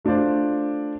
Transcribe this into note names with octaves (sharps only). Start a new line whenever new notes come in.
A3 D4 F4 C5 D5